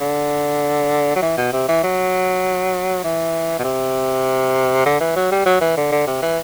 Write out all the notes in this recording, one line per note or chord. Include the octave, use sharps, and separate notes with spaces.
D3
F#3
E3
B2
C3
E3
F#3
E3
B2
C3
D3
E3
F#3
G3
F#3
E3
D3
D3
C3
E3